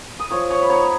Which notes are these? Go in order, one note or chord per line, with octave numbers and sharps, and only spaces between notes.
D#6
F3 C#5 C#6
C#5 C#6
B5
B3 D#4 C#5 C#6